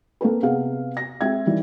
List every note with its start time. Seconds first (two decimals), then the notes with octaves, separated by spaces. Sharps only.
0.21 A#3 C4 A4 B4
0.43 C3 B3 G#4 F5
0.97 A#6
1.21 G#3 C4 E5 G#6
1.46 D#3 E3 G3